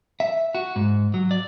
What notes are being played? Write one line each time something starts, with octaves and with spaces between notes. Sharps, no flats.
E5
F#4
G#2
F#3
D5